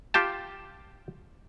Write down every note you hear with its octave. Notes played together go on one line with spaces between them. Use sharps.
F4 G4 G5 A5